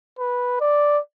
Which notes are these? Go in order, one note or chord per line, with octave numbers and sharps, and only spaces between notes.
B4
D5